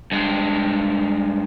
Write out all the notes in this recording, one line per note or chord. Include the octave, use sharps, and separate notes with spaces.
G2 G#3